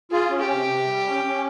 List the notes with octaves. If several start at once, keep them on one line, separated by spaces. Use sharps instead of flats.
F4 G#4
C#4
G4
C3
C3
G3
C#4
C#4